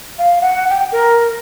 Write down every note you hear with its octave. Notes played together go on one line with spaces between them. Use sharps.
F5
F#5
G5
A#4